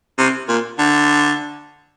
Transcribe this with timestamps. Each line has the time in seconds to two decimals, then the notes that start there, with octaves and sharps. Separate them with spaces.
0.18 C3
0.48 A#2
0.79 D3